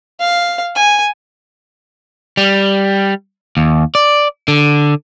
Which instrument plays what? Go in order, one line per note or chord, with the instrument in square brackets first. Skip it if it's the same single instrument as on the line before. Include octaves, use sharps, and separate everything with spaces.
[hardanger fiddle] F5
G#5
[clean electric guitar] G3
D#2
D5
D3